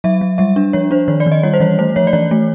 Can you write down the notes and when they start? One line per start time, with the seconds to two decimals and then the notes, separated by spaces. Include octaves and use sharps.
0.04 F#3 E5
0.21 F#3
0.38 G3 E5
0.56 D4
0.73 F3 C#5
0.91 D4 C5
1.08 D#3 C#5
1.20 D5
1.26 D#3
1.32 D#5
1.43 G3 C#5
1.54 C5
1.60 E3 C#5
1.79 A3 C5
1.96 F3 C#5
2.07 D5
2.13 E3 C#5
2.31 A3